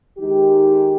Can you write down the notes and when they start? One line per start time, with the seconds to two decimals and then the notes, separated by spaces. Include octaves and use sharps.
0.18 D#3 G#3 D#4 G4